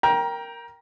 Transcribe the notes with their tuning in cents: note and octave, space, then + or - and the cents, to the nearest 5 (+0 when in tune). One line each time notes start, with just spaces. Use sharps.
A#4 +0 G5 +0 A#5 +25